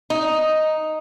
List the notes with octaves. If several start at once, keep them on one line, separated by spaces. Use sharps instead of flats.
D#4